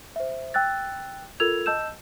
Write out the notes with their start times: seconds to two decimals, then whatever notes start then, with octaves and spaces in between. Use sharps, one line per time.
0.16 C5 E5
0.54 G5 E6 F#6 A6
1.40 F4 A4 A#4 E6 G#6 F7
1.66 D#5 A5 E6 G6 E7